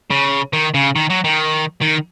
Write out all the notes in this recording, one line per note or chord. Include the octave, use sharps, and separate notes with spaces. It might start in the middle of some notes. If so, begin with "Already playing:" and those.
C#3
D#3
C#3
D#3
F#3
D#3
D#3